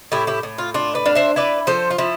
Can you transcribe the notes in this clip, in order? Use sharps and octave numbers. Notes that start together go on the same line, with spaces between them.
A2 E4 G4
E4 G4
A2
F4
D4 F4
B4 D5
D4 F5
C5 E5
E4 B4 D5
F3 A4 C5
F4
F3 E4